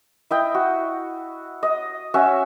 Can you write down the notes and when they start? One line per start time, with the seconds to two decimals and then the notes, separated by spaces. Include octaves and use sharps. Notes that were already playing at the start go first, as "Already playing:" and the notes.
0.31 E4 D#5 G5
0.54 F#4
1.63 D#5
2.14 C#4 F#4 E5